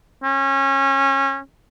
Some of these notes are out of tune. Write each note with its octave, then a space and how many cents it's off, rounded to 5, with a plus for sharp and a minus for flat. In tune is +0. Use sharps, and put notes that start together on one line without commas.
C#4 -25